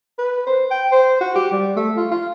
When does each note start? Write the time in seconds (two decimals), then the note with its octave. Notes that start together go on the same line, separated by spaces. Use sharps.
0.18 B4
0.47 C5
0.71 G5
0.92 C5
1.21 F#4
1.35 G4
1.52 G3
1.76 A3
1.96 F4
2.11 F4